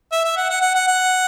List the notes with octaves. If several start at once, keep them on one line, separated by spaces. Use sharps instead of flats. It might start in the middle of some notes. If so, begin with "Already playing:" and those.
E5
E5
F#5
F#5
F#5
F#5
F#5